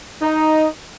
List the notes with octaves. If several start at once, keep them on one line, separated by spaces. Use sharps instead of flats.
D#4